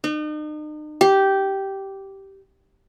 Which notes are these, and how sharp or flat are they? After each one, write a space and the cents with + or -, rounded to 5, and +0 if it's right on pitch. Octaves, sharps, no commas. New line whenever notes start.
D#4 -40
G4 -10